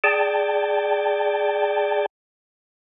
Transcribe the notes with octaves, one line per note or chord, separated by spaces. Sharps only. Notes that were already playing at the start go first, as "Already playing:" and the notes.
G#4 D5 G5 A5